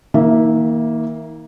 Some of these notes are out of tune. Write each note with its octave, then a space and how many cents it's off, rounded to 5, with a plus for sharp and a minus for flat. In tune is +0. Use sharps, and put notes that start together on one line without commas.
D#3 +45 A#3 +0 E5 -15